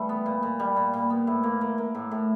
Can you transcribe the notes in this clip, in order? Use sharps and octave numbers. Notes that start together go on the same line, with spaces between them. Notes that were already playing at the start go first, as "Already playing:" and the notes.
Already playing: E3 G3 A3
B3
A#2
A#2
G3
A#2
A#2
B3
A2
A#3
A#3
A#3
A2
A2